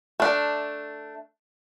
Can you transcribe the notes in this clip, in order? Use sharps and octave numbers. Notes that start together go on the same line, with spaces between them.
A3 D4